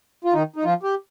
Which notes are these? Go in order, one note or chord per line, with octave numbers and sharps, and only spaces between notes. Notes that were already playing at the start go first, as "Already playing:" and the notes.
F4
D#3 D#4
D#4
F3 F4
G4